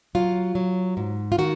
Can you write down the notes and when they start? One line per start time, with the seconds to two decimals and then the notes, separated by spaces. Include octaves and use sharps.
0.15 F#3 F4
0.55 F#3
0.97 G#2
1.32 F4
1.38 D#3 F#4